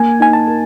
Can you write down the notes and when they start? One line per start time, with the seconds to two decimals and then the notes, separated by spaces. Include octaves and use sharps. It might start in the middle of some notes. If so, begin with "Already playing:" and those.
Already playing: A#3 G#5
0.20 D#4 G#5
0.33 A5
0.47 A#4